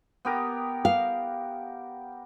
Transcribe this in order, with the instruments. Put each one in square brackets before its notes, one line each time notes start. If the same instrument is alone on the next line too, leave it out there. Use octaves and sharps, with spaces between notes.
[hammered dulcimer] B3 G4 A#4
[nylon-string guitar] F5